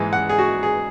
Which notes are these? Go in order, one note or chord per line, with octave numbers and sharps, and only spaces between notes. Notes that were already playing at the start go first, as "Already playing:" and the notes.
Already playing: G#2 E3 G#3 G#5
F#5
G#4
F#4
G#4